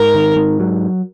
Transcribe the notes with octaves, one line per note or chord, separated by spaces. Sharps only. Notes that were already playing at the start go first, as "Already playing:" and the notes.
Already playing: G#2 A#4
D#3
G#2
F#3